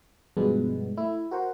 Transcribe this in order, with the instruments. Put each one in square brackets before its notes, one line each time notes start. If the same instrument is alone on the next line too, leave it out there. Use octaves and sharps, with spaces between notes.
[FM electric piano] G2 B2 F3 G#3 B3 D4
A3 E4
F#4 A#4 C5 F#5